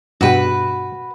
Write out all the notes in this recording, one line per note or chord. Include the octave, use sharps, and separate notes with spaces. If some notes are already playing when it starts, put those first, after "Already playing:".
G2 B2 F#4 B4 G5